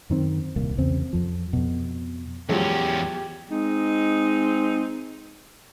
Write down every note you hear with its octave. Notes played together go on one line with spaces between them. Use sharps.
F#2 D#3 C4
D#1 C2 A#3
E2 C#3 C4
F2 F3
F2 B2
E2 F3 F#3 G#3 C#4 G4
G#3 C4 D#4